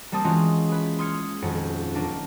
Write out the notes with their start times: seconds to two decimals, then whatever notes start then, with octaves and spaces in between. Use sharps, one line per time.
0.12 G3 A#3 C4 A5 D#6
0.24 E3 G#3 C#4 F4 F#4
0.69 G#4 B4
0.99 C6 D#6 F6 G#6 C#7
1.42 D#1 F2 C#4 F#4 F#5
1.95 F#3 A#3 D4